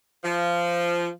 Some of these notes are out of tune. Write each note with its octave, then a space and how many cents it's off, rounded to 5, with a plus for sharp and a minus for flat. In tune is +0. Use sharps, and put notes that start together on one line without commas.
F3 -15